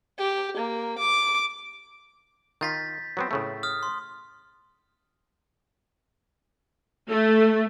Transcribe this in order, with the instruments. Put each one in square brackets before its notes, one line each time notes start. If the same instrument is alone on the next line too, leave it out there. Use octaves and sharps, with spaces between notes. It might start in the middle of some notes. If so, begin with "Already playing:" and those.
[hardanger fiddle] G4
A#3
D6
[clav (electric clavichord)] D#3 F4 [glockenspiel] G6 A6 B6
[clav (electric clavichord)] F#3 B3 C4
A2 C#3 A3
[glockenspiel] D#6 F6
C6
[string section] A3